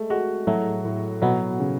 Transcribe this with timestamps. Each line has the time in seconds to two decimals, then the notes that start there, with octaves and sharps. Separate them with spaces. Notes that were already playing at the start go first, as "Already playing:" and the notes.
Already playing: G#3 A3
0.10 G#3 F#4
0.47 A2 F#3 A3
0.84 A2
1.22 B2 F#3 B3
1.60 C#3